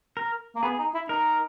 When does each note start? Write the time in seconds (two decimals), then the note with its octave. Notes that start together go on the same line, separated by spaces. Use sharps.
0.17 A#4
0.56 A#3
0.63 B3 G#4
0.79 D#4
0.95 E4
1.09 D#4 A#4